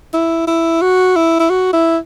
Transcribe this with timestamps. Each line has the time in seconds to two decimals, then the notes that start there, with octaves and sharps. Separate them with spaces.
0.13 E4
0.47 E4
0.81 F#4
1.16 E4
1.39 E4
1.50 F#4
1.73 E4